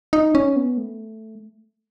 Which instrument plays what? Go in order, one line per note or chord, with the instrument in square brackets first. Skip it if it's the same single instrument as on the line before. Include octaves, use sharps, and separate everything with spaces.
[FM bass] D#4
C#4
B3
A3